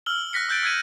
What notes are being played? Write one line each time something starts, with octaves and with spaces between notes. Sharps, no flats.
E6 F6 F#7 G7
F6 F#6 A#6 B6 C#7
E6 F#6 G6 A6 D7
E6 F#6 G#6 B6 D#7